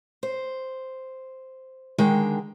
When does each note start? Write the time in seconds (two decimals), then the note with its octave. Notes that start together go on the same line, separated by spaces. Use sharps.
0.23 C5
1.98 D3 D#3 G#3 G5